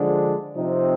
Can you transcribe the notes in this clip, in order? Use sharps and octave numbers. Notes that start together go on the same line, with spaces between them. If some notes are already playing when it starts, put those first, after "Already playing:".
Already playing: D3 F3 G#3 D4
C3 F3 C4 D#4